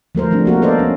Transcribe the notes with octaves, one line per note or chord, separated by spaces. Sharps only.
F3 A3 A#4 C5
F3 G3 A3 C4 D4
A#3 F#4 A#4
B3 A4 A#4 C5 D5 D#5
C#4